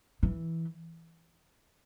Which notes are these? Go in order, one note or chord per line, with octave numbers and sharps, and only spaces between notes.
E3